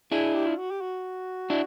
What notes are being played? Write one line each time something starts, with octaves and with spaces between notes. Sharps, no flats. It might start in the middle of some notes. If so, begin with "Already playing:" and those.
D4 E4 G#4
G4
F4
F#4
G4
F#4
D4 E4